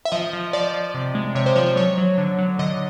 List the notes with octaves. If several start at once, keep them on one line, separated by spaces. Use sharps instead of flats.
E5
F3 D#5
F3
F3 D5
F3
C3
G#3
C3 C#5
C5
F3 C#5
C5
F#3 C#5
F#3
D3
F#3
D3 D#5